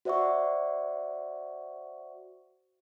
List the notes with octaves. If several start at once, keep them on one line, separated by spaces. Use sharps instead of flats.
F#4 C5 D5 E5 F#5 C#6